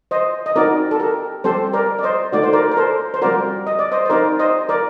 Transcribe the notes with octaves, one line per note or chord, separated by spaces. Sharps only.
C5 D#5
D#5
C4 D#4 F#4 A#4 D5
A4
G4 A#4
G3 C4 G4 A4 C5
A#4 D5
D5
C5 D#5
A3 D#4 F#4 D5
C5
A#4 D5
A#4
A4 C5
C5
G3 C4 F#4 A#4 D5
D#5
D5
C5 D#5
C5
C4 D#4 G4 A#4 D5
C5 D#5
A#4 D5